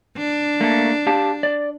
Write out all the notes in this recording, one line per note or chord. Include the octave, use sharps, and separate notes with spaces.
D4
A3 A#3
G4 F5 A5
D5